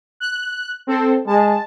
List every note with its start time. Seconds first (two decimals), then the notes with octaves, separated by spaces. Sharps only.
0.20 F#6
0.87 C4 A4 C5
1.27 G#3 A5